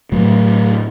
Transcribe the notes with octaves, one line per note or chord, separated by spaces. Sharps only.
A2 F#3